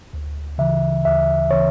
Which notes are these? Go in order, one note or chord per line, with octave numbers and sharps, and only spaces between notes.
D2
C#3 E3 E5
D2 E5
C#3 E3 C#5